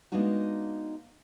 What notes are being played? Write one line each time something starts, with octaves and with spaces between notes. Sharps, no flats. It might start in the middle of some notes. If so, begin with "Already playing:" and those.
G#3 A#3 B3 D4 D#4 F#4